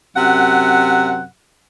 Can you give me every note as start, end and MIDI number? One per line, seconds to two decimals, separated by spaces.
0.17 1.25 42
0.17 1.25 48
0.17 1.25 78